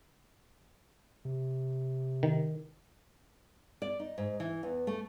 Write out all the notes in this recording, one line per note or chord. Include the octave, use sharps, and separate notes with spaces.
C3
D#3
D5
D#4
G#2
E3
E2
A3